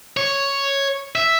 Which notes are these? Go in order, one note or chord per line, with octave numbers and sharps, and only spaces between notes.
C#5
E5